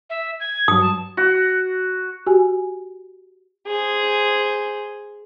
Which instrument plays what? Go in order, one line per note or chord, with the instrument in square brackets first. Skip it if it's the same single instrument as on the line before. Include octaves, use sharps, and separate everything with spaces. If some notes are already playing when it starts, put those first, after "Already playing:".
[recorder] E5
G#6
[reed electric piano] G2 F#3 [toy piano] D#6
[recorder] A5
[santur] F#4
[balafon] F#4 G4 G#5
[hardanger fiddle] G#4 C5